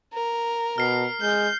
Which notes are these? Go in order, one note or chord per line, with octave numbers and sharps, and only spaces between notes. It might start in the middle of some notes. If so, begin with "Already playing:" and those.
A#4
B2 F6 C7
G#3 G6